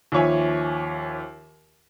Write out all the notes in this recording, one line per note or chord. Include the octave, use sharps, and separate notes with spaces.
D#2 F3 F4 C#5 E5 G#5